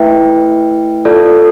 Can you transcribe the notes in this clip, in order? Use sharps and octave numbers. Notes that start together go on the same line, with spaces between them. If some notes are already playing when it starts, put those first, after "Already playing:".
Already playing: A3 E4 B4 E5 G5
F4 A4 D5